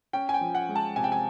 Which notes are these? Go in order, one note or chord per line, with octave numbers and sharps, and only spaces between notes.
C#4 G5
G#5
G5
F3
F#5
G#3
A5
C3 G#5
G5
G#5